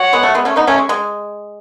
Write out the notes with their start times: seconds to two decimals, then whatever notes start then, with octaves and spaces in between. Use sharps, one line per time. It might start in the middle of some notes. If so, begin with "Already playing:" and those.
Already playing: F#4 C#5 F#5
0.13 G#3 B3
0.23 A3
0.35 G#3 B3
0.45 A3 C#4
0.56 B3 D#4
0.67 A3 C#4
0.78 G#3
0.89 G#3